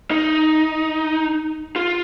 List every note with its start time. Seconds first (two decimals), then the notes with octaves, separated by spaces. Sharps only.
0.11 D#4
1.76 F4